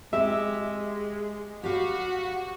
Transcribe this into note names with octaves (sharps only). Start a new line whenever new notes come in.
G#3 G4 E5
F#4 G4 B4 F5